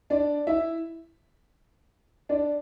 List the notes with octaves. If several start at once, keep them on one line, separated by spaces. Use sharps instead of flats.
D4 D5
E4 E5
D4 D5